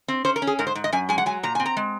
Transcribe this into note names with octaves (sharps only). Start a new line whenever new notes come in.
C4
C#4 C5
A#4
C#4
G#4
G#2 A#4
C5
G#2
D#5
F#2 G#5
G#3 G#5
F#5
F#3 G#5
A#2 A#5
C4 G#5
A#5
G#3